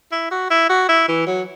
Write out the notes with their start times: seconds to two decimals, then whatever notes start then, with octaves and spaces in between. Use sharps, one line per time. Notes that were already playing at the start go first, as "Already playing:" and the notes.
0.12 E4
0.31 F#4
0.50 E4
0.69 F#4
0.89 E4
1.08 E3
1.27 F#3